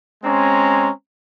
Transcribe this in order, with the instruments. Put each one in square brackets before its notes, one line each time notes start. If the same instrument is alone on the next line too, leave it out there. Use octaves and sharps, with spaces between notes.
[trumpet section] G#3 C4 C#4 A#5